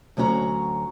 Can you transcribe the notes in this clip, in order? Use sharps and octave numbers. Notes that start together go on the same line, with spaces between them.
D2 F#3 C#4 F#4 A#5